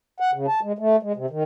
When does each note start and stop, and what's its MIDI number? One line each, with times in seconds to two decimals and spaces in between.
0.20 0.31 78
0.33 0.47 49
0.48 0.60 81
0.62 0.72 56
0.78 0.96 57
1.03 1.13 56
1.16 1.26 48
1.30 1.43 51